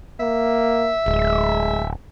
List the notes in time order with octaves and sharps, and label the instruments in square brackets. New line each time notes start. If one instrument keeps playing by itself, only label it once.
[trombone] A#3 [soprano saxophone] E5
[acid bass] D1 [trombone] G#3